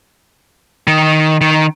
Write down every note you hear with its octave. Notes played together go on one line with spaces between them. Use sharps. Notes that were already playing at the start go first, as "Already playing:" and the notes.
D#3
D#3